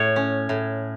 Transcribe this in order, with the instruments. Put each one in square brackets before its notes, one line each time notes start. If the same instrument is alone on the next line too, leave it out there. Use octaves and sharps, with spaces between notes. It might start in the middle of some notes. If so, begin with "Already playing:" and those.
Already playing: [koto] A2 C#5
C#4
A2